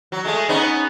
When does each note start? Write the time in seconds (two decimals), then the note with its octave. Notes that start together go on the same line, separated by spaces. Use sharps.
0.12 F#3
0.25 G#3 A3
0.49 B3 C#4 D#4